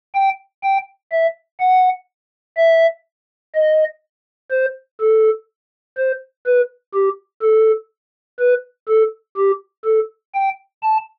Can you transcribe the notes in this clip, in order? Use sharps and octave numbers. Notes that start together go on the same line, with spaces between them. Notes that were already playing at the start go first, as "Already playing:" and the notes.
G5
G5
E5
F#5
E5
D#5
C5
A4
C5
B4
G4
A4
B4
A4
G4
A4
G5
A5